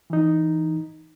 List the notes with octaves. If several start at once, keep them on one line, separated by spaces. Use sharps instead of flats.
E3 D#4